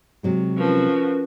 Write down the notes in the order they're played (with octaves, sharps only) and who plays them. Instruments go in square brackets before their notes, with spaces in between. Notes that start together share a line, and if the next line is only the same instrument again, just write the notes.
[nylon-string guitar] C3 F#3 G#3
[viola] F3 F#4 [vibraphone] C#4 A#4 B4